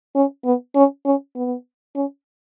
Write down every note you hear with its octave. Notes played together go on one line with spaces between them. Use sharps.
C#4
B3
C#4
C#4
B3
C#4